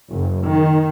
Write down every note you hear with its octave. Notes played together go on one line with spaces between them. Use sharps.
F#1
D#3